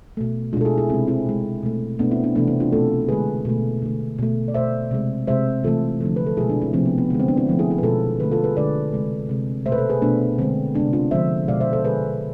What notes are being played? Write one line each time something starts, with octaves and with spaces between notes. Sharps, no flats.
B2 A3
B2 G#3 D4 F4 A4
E4 G#4
E4 G#4
C3 G#3 C4 E4
C4 E4
B2 G#3
B2 A3
B2 A3 B3 D4
C4 E4
B3 D4
C3 E3 A3 B3 D4
C4 E4
D4 F4
B2 A3 F4 A4
D3 G#3 G#4 B4
B2 A3
D3 A3
B2 A3
D5
B2 A3 C5 E5
C3 G#3
C3 G#3 C5 E5
C3 E3 A3 F4 A4
D3 F3 A3
B4
A4
B2 G#3 E4 G#4
D4 F4
C4 E4
C3 F3 A3 C4
B3
B3
D3 G#3 B3
C4
B3 D4
C4 E4
D3 F3 A3
E4 G#4
E4 G#4
B4
B2 G#3 F4 A4
D3 A3 G#4 B4
F4 A4
G#4 B4
D3 G#3 B4 D5
C3 G#3
C3 G#3
B2 A3 B4 C5 E5
A4 C5
G#4 B4
B2 A3 B3 D4
D3 G#3 C4
G#3 B3 D4
C3
D4 F4
D3 F3 G#3 C5 E5
B2 G#3 D5 F5
C5 E5
A4 C5
D3 G#3 G#4 B4